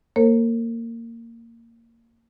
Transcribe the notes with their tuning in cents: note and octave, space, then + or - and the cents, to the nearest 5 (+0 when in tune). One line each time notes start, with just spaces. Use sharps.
A#3 -15 A#4 -40 C#5 -45